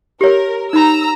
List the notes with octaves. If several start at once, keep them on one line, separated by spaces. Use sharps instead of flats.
G4 A#4 C#5
D#4 A#5 B5 E6